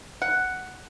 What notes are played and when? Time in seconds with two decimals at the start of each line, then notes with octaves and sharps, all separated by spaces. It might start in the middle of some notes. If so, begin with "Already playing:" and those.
0.22 F#5